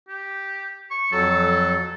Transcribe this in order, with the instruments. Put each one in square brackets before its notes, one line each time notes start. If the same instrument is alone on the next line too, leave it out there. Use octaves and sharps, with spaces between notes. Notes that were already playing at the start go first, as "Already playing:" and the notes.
[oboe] G4
C#6
[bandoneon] F2 F#3 [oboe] A4